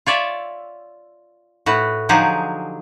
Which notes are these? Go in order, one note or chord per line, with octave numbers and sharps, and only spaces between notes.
F4 C#5 D5 E5
A2 F#4 B4
D3 F3 F#3 D#4 G4 G#4